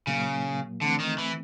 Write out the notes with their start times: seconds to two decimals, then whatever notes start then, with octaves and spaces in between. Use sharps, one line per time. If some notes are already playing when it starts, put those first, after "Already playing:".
0.07 A#2 C#3 F#3 A#3
0.81 D3 E3 A3 C4
1.00 D#3
1.18 E3